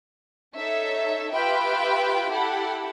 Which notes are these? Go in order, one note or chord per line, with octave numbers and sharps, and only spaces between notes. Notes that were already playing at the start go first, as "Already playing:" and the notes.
D#4 A4 C#5 E5
F4 G4 B4 E5 G5 B5
E4 G4 A4 F#5 B5